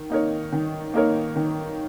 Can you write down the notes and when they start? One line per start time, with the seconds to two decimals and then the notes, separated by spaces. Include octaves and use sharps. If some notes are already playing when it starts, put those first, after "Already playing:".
Already playing: D#3
0.10 A#3 D#4 A#4 C#5
0.53 D#3
0.94 A#3 D#4 A#4 C#5
1.36 D#3